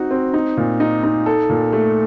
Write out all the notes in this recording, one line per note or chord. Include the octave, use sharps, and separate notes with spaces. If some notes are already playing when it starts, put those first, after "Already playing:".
Already playing: C4 D#4 F#4
C4
D#4
A#2
D#4
D#4
A4
A#2
A3